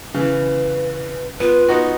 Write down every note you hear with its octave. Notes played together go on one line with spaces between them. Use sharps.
C#3 E3 B4
B3 F4 B4
B3 D#4 F#4